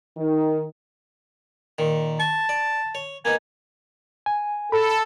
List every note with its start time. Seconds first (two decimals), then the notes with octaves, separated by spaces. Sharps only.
0.17 D#3
1.78 A#2 D#3
2.20 A5 C#6
2.49 D5
2.95 C#5
3.25 A#3 B3 D#4 G#5
4.26 G#5
4.72 A4 B5